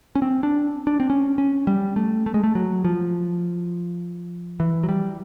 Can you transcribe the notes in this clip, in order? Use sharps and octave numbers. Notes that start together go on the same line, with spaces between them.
C#4
C4
D4
D4
C4
C#4
C#4
G3
A3
A3
G#3
A3
F#3
F3
E3
F#3
G3